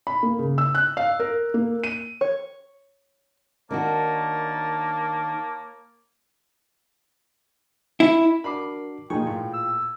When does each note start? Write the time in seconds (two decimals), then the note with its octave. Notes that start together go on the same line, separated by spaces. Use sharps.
0.07 B5
0.23 A#3
0.39 C#3
0.58 E6
0.75 F#6
0.97 F5
1.20 A#4
1.54 A#3
1.84 D#7
2.21 C#5
3.71 D#3 A#3 D4 F#4 C#5 A5
8.00 E4
8.44 D4 F#4 A#4 B5 D6 C7
9.10 A#2 F3 D#4 G#4 G5 C#6
9.27 A2 F4
9.53 E6